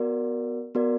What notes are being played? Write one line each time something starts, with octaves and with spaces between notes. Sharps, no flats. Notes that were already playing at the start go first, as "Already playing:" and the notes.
Already playing: B3 F#4 A#4 D5
B3 F#4 A#4 D5